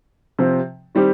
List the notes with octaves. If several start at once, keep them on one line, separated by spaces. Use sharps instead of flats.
C3 F3 C4
D#3 G3 C4 G4